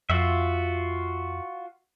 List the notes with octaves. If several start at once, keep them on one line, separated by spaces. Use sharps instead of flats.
F2 F4 F#4 E5